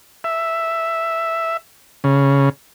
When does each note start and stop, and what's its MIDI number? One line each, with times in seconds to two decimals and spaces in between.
0.24 1.57 76
2.04 2.49 49